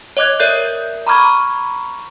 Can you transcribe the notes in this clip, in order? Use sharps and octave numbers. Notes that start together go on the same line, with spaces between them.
C#5 D#5 D6 F#6 G#6
A#4 D5 E5 F#6 G6
A#5 B5 C#6 D6 F6 G#6